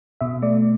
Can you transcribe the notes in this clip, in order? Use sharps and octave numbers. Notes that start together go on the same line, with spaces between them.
B2 E5
A3 D5